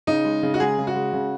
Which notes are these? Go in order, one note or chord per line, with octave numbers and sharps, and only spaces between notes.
C#3 D#4
G#3
C#3
F#4
G#3 G#4
C#3
F#4
G#3
C#3